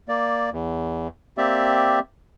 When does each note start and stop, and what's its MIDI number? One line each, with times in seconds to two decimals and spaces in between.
0.09 0.50 58
0.09 0.50 74
0.52 1.08 40
1.38 1.99 58
1.38 1.99 60
1.38 1.99 67
1.38 1.99 74
1.38 1.99 76